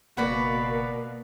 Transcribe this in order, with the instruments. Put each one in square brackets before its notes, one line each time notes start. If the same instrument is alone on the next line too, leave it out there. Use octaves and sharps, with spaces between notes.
[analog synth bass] F#1 [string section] B2 [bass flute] A#3 [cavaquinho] F#4 B4 D5